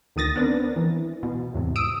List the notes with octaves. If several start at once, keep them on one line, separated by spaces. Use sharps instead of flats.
D2 D#3 D#6 A6 A#6
B3 C4 D4 A#4
E3
B2
E2 G#2 C3
D#6 E6 D7